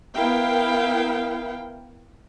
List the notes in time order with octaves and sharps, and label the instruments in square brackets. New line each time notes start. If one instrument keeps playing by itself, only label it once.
[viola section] B3 E4 A#4 F5 G5